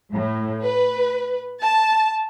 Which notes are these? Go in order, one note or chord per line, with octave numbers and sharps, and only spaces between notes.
A2
B4
A5